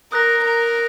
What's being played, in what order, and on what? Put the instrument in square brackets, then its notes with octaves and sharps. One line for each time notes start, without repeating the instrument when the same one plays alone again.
[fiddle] A#4 [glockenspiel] D#6 F#6 A#6
[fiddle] A#4